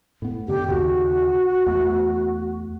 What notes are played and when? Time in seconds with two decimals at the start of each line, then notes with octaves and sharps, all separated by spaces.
0.22 A2 B3
0.48 F#2 D3 G4
0.69 D#2 C#3 F#4
1.66 E2 A3